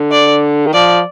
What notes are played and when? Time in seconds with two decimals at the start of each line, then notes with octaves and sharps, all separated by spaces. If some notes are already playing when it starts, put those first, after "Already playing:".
Already playing: D3
0.12 D5
0.66 D#3
0.73 F3 D5